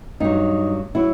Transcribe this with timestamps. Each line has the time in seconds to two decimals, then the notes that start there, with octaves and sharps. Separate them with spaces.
0.20 G2 F#3 D#4
0.95 F#3 E4